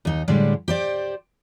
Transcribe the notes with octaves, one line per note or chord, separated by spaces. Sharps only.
D#2 D#4
A2 D3 G3 G#3
G4 C5 D5